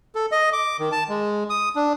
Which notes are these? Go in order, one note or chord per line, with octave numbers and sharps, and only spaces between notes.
A4
D#5
D6
D#3
A5
G#3
D#6
D4